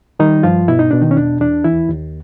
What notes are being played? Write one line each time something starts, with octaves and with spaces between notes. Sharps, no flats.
D#3 G3 D#4
G2 F3 F4
B2 E4
D#4
B2 D4
D#3 D#4
C#4
E2 D4
E2 D4
D#2 E3 E4
D#2